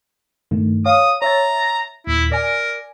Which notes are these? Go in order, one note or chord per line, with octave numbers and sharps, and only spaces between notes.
G2 D#3 A3
C#5 F5 D#6
C#5 E5 A#5 A6
D#2 A#2 E4
A#4 D5 G#5